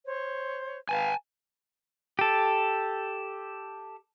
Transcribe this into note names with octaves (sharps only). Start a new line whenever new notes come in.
C5 C#5
B4 F5 G#5 A5
G4 A4